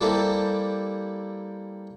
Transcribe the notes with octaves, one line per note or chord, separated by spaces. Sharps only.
G3 A#3 C4 E4 G4 A4